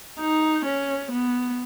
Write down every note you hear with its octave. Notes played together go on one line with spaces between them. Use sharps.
D#4
C#4
B3